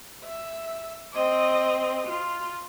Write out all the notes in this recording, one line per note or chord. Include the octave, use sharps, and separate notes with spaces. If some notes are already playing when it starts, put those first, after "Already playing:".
E5
C4 D#5
F4